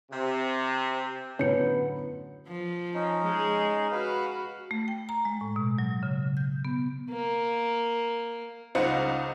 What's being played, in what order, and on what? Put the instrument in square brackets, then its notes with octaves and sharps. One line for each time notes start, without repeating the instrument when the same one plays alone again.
[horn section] C3
[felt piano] F#2 A2 D3 [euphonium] B3 [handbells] C#4 C#7 [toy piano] C#5
[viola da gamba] F3
[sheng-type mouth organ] C#4 D#4
[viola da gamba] G#3 G#4
[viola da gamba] F#4 [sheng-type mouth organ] B4 F5
[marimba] A3
G5
A#5
G#3
A2
B2
F#3
C#3
G6
B3
[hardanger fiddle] A#3
[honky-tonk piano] C#2 D#4 F4 C5 F#5 C#7